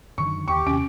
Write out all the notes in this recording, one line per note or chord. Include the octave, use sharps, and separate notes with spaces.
F#2 D3 D#3 C#6
D#2 G4 C#6
D#2 C3 C#4 D7